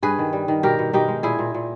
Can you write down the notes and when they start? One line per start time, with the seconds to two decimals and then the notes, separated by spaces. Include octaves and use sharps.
0.02 G2 G#4 B4
0.19 D#3
0.33 G3
0.48 D#3
0.63 B2 G4 A#4
0.79 B2
0.93 B2 D#4 G4
1.08 G#3
1.23 A#2 E4 G#4
1.39 A#2
1.54 A#2